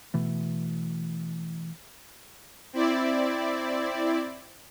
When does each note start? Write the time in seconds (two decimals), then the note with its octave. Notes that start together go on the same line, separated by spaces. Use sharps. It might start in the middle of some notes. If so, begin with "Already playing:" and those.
0.14 B2 E3 A3
2.73 C4 E4 D5